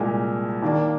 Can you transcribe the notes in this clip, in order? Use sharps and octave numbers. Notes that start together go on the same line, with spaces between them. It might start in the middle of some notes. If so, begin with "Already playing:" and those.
Already playing: C2 A#2 G#3
D#2 D#3 A#3 D4